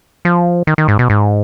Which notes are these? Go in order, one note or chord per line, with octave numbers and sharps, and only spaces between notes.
F3
D#3
D#3
G#2
B2
G#2